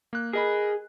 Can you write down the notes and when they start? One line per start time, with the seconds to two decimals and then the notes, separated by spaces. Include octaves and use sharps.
0.13 A#3 F#6
0.33 G#4 A#4 D#5 B5